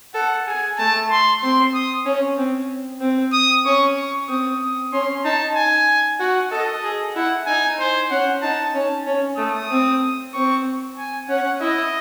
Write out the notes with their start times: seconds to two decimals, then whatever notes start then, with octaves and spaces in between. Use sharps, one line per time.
0.14 A4 F#5
0.47 G#4 G#5
0.78 A3 A5
1.11 C6
1.41 C4 C6
1.74 D#6
2.06 C#4
2.38 C4
3.01 C4
3.33 D#6
3.65 C#4 C#6
3.96 C#6
4.28 C4 D#6
4.61 D#6
4.93 C#4 C6
5.25 D#4 A5
5.55 G#5
6.20 F#4 F#5
6.51 A4 D#5
6.83 G#4
7.15 E4 F#5
7.46 D#4 G#5
7.79 C5
8.10 C#4 F#5
8.42 D#4 A5
8.74 C#4 A5
9.07 C#4
9.38 A3 D#6
9.70 C4
10.34 C4 C#6
10.97 G#5
11.29 C#4 F#5
11.61 E4 D#5